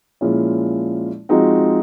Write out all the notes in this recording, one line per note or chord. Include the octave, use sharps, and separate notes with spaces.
A#2 F3 G#3 C#4 E4
F3 G#3 C4 D#4 F#4